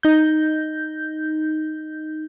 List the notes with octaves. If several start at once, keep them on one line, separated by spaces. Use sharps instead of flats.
D#4 G6